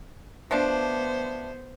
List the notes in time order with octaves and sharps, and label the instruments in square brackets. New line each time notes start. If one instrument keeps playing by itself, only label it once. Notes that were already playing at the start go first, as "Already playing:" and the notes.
[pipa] F3 A3 D4 [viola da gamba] B3 C5